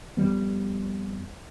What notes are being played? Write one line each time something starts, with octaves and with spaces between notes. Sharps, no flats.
F2 G3 B3